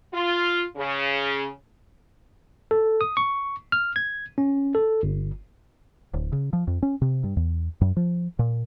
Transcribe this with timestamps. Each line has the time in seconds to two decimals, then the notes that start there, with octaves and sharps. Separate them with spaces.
0.14 F4
0.77 C#3
2.71 A4
3.01 D#6
3.17 C#6
3.72 F6
3.96 G#6
4.38 C#4
4.75 A4
5.03 G1
6.14 D1
6.32 C#3
6.53 F3
6.67 F2
6.83 C#4
7.02 C3
7.24 G2
7.37 E2
7.81 F#2
7.97 F3
8.39 A#2